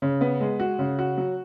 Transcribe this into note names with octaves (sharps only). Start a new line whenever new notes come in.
C#3
B3
G#3
F#4
C#3
F#4
F#3